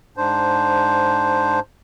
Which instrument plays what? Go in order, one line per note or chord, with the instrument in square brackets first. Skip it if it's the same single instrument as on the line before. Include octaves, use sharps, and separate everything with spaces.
[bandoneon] G#2 D4 C5